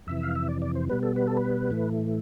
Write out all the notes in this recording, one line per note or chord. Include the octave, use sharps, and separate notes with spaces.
F2 C3 E3 E5
F5
E5
D5
D5
C5
B2 G3 B3 B4
A4
B4
A4
B4
A2 E3 A3